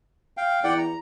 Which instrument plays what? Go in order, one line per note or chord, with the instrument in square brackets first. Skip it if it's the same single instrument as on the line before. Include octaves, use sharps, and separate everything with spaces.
[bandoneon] F5 G5
[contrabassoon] E2 [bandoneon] D5 F#5 G5
[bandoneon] A#5